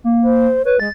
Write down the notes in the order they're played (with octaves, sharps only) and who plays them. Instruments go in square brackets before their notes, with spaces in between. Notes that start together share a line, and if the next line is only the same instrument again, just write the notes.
[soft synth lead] A#3
[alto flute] C5
[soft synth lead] B4 [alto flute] C#5
[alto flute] G#3 [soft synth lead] A6